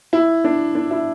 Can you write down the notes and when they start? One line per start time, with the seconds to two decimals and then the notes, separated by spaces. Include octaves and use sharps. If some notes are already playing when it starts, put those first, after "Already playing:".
0.13 E4
0.44 D4
0.75 D4
0.91 E4